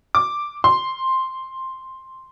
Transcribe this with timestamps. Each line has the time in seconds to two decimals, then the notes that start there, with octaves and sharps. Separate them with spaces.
0.15 D6
0.64 C6